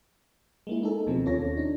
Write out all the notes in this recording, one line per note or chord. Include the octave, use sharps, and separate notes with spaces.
G#3 A#3 E4
D#4 G#4 A4
D2 B2 D#3 F3 C4
D#2 C#4 F4 A4 C#5 A#6
D4 D#4